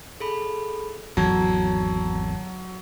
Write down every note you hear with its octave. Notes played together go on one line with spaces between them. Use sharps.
G#4 A4 B5
G#1 E2 D3 F#3 A5 A#5 G#6